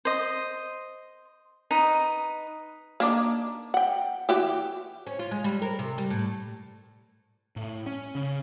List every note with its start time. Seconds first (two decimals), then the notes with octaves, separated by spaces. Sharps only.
0.05 C5 D#5
1.71 D#4 B4 D#5
3.00 A#3 D4 D#4
3.74 F#5 G5
4.29 E3 F#4 G4
5.07 C#4
5.19 F4
5.31 G#3
5.44 G3
5.62 A#4
5.79 C3
5.98 G3
6.10 A2
7.56 A2
7.86 C#4
8.15 C#3